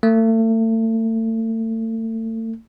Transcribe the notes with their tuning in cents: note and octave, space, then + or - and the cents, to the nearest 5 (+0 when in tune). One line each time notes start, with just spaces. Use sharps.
A3 +35